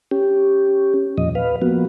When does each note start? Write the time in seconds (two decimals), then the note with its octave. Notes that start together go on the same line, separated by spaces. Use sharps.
0.11 C#4 G4
1.18 E2 A#2 F3 D#5
1.35 B4 F5
1.62 F3 A#3 B3 F#4